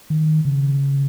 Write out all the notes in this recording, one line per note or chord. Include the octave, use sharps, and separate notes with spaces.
D#3
C#3